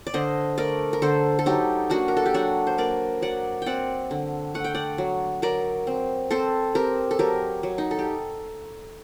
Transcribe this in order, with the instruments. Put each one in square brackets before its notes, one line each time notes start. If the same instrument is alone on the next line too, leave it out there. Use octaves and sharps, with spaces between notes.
[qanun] D5
D3 C5 D#5
A3 A#4 D5
A#4
D3 A4 C5
A4
F#3 D#4 G4
A#3 D4 F#4
A#4
A4
G4
F#3 D4 F#4
C5
A#3 A#4 D5
F#3 D5 F#5
C4 D5 F#5 G5
D3
A3 F#5
G5
D5 F#5
F#3
F#3 A#4 D5
C4
C4 A4 C5
C4 G4 A#4
A4
F#3 G4 A#4
F#3
D#4
A4
G4